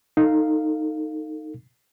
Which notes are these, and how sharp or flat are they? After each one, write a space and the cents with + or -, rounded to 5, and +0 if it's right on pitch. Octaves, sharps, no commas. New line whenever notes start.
D#4 +0 A4 +30 F5 +0